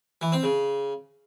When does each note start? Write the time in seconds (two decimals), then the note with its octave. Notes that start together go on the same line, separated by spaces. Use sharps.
0.21 E3
0.32 C4
0.43 C#3